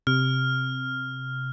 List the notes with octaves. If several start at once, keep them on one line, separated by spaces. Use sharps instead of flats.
C3 F6